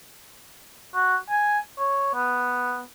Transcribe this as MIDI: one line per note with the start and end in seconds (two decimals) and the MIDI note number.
0.94 1.16 66
1.29 1.59 80
1.78 2.12 73
2.14 2.81 59